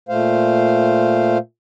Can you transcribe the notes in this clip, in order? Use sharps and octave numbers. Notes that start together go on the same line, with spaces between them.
A#2 A3 C5 F5